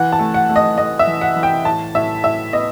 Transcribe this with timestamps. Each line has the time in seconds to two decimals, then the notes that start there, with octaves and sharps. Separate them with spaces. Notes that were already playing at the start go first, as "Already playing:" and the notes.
Already playing: E3 F#5
0.12 A5
0.19 A3
0.34 F#5
0.49 A3
0.56 D#5
0.78 A3 D#5
0.99 E5
1.07 E3
1.21 F#5
1.36 E3
1.43 G5
1.65 A2 A5
1.95 A2 E5
2.24 A2 E5
2.53 B3 D#5